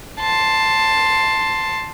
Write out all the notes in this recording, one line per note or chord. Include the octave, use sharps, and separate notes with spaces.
A5 C6